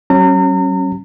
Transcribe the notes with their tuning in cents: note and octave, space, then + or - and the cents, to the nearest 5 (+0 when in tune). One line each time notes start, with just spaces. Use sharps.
F#3 +45 C#4 -20 A#5 -35